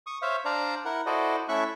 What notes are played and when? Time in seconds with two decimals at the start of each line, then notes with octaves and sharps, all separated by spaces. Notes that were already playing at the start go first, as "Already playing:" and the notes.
0.07 C#6 D#6
0.22 C5 C#5 E5 F5
0.45 D4 C5 D5 F5 A#5
0.85 E4 A#4 F#5
1.06 E4 F#4 A4 C5 D5 D#5
1.49 A3 C#4 E4 E5 C#6 F#6